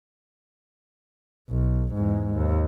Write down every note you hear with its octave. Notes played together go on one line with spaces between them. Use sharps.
B1
E2 G#2
D#2